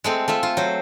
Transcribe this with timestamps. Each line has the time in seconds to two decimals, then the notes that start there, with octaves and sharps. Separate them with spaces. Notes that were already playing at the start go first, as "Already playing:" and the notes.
0.04 G#3 A3 C4
0.28 A3 F4 E5
0.43 F4
0.57 F#3 C5